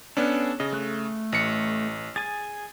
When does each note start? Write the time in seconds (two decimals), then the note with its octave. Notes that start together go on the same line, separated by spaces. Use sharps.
0.17 B3 C#4 D4 A4
0.60 C#3 D#5
0.72 A3 A4 F#6
1.32 A1 C#7
2.16 G#4 G#5 A6